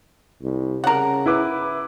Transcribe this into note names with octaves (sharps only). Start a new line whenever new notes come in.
C2
C#3 A#4 F#5
E4 B4 D6